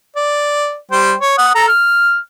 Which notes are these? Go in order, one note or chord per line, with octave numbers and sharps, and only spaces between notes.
D5
G3 C5 G5
C#5
F#5 D#6
A4 A#5
F6